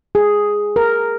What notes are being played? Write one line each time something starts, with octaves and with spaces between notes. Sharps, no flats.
G#4
A#4